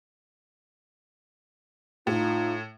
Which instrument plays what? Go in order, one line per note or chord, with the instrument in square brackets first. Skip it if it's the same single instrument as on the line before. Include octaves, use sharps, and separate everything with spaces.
[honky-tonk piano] A2 [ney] D#4 [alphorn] F4